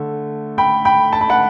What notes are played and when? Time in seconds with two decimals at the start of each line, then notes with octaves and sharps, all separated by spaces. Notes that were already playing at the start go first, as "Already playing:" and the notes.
Already playing: D3 A3
0.58 G5 B5
0.85 G5 B5
1.13 A5
1.21 B5
1.30 F#5 A5